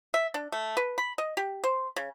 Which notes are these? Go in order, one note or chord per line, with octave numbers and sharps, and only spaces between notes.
E5
D4
A3
B4
B5
D#5
G4
C5
C#3